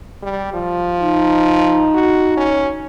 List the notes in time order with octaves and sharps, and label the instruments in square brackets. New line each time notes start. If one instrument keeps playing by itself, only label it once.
[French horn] G3
F3
[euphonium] D#4
[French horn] F#4
C#4